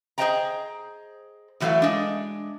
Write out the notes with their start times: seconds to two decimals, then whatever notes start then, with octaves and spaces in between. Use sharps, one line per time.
0.18 G#4 C5 D5 D#5 G5 A#5
1.60 A2 E3 F#3 A3 E4 F5
1.82 G#3 D4